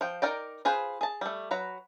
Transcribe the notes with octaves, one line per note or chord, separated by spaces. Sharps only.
F3 G5
D#4 A#4 D5 G5
F4 G#4 B4 C5
G#4 A5
G3 A3
F#3 B4 A#5